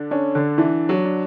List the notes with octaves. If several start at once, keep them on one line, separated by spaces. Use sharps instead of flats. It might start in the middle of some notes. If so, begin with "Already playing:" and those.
Already playing: D3 D4
C#4 D4
D3
E3 D4
F#3
D4